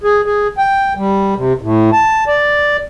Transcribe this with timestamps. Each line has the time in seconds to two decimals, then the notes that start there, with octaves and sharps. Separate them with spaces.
0.04 G#4
0.25 G#4
0.58 G5
0.97 G3
1.36 C3
1.61 A2
1.92 A5
2.27 D5